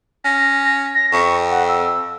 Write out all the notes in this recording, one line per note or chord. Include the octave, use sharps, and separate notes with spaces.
C#4 A#6
A#6
F2 C#6
F#5
E6